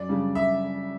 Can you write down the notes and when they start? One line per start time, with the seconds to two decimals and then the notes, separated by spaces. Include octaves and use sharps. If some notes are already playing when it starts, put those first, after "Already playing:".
Already playing: F#2 D5
0.09 C#3 G3 D4
0.35 E5